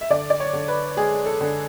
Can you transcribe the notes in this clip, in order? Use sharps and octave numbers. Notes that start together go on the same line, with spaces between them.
E5
D3 D5
D5
C#5
D3
B4
G#3 G#4
A4
D3